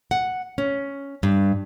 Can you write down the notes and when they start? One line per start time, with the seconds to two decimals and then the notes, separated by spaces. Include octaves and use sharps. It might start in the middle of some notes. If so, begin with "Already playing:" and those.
0.11 F#5
0.58 C#4
1.23 G2